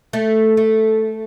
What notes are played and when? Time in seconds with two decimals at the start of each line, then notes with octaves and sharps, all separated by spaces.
0.13 A3
0.57 A3